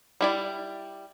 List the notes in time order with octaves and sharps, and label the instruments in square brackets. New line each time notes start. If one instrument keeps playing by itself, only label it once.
[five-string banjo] G3 E4 D5